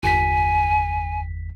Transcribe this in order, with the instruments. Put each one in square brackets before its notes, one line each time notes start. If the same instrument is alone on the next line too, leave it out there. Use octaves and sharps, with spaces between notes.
[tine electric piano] G1 E2 B6 [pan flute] G#5